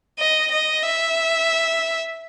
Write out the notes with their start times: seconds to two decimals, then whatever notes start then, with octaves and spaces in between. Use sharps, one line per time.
0.19 D#5
0.52 D#5
0.83 E5